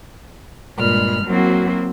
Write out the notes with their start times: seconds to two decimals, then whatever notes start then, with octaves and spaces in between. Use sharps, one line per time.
0.79 G2 A#2 G#3 B5 F6
1.25 F#3 A#3 C4 E4 F#4